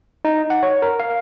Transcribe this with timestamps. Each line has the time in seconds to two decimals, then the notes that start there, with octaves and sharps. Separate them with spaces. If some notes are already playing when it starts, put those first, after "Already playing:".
0.25 D#4
0.50 F#5
0.63 C#5
0.82 A#4
1.00 F5